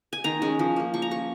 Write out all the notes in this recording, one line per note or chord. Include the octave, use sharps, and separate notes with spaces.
G#5
D#3 A#5
G#3 C#4
F3
A#3 C#4
F3 C#6
A#5
C#4 C#6